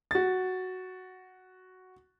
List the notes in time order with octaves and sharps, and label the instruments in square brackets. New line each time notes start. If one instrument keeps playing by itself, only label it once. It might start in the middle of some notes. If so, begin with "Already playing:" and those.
[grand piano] F#4 A6